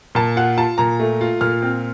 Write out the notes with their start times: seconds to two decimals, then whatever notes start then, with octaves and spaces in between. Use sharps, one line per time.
0.15 A#2 A5
0.36 F4 F#5
0.57 F4 A5
0.78 A#2 A#5
1.00 A3
1.21 F4
1.41 A#2 F6
1.62 C4